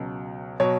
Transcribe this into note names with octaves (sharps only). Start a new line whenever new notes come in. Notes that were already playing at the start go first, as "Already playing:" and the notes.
Already playing: C#2 B2 F#3
B2 F#3 C#5